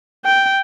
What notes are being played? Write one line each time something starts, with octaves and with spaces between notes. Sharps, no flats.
G5